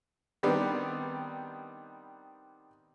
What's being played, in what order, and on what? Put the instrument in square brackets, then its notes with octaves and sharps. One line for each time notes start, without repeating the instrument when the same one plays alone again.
[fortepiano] D#3 G3 B3 C4 D4